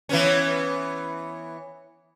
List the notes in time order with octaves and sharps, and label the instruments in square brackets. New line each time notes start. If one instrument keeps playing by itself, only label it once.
[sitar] E3 B3 C#4